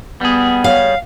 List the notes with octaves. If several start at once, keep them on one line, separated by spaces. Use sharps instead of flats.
G3 B3 G#4
C#5 F5